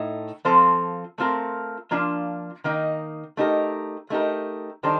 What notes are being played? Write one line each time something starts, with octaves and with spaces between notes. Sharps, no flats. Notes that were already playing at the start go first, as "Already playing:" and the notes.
Already playing: A2 A3 D#4
F3 C4 F4 A4 C5
A3 C4 F4 A#4
F3 A#3 D4 F4
D#3 A#3 D#4
A3 D#4 G4 A#4
A3 D#4 G4 A#4
D#3 G3 D4 A4 C5